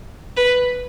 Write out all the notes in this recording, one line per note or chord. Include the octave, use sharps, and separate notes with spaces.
B4